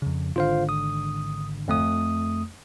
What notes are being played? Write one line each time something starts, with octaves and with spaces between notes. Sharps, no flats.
F2 C#3
G#1 D3 D4 F4 C5 F5
D#6
F2 A3 D#6